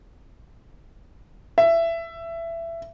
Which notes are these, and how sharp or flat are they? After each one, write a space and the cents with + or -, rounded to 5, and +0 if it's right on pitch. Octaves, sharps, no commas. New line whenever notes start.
E5 +20